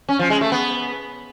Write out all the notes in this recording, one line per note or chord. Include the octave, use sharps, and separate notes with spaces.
C#4
F3
G#3
A3
B3